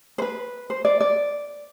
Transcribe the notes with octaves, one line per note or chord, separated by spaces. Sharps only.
C5
B4
C5
D5
D5